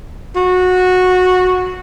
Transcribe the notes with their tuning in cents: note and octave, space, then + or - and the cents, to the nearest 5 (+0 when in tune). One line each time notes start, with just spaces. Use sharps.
F#4 -15